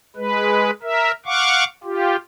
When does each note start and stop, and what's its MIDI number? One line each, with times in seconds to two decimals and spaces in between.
0.16 0.71 56
0.16 0.71 71
0.82 1.11 70
0.82 1.11 76
1.26 1.64 77
1.26 1.64 78
1.26 1.64 85
1.26 1.64 86
1.84 2.16 65
1.84 2.16 67